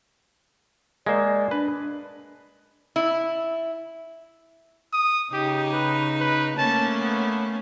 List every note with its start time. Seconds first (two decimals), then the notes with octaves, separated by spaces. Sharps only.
1.06 G#3 A#3 C5 D5
1.51 D4 B4
2.96 E4
4.93 D#6
5.33 C#3 D#4 G4
5.73 B4
6.20 B4
6.58 A3 A#3 C#4 A5
7.01 B3